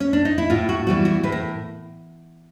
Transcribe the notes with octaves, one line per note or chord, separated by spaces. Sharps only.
C#4
D4
D#4
E4
A2 F4
F#4
E3 G3 B3 F#4
F#4
A2 B4
A#4